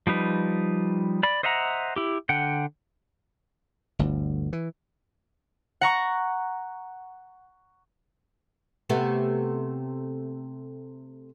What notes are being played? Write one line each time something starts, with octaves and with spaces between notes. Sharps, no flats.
F3 G3 D#4 B4
D5 B5
C5 D#5 E5 F#5 A#5
E4 G4
D3 F#5 G5
G1 D2
E3
F#5 A#5 C#6
C3 A3 B3